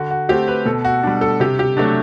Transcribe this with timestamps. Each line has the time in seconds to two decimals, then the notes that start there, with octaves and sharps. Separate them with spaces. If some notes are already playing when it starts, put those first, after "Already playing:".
Already playing: D3 F#4
0.11 F#4
0.29 A3 C4 G4
0.48 B4
0.66 B2 A4
0.85 F#4
1.03 G3 D4
1.21 A4
1.40 C3 G4
1.59 G4
1.77 F#3 A3 D4